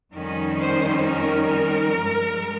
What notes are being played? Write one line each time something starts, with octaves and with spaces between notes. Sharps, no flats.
F2 D#3 G3 C#4
C5
A#4
G2 F3 G#3